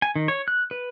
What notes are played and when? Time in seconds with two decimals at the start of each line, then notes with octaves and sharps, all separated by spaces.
0.02 G#5
0.16 D#3
0.28 C#5
0.48 F#6
0.71 B4